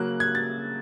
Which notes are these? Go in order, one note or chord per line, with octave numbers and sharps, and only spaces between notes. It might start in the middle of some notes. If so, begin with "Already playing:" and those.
Already playing: C#3 F#3 A#3 C#4 F#6
G#6
A6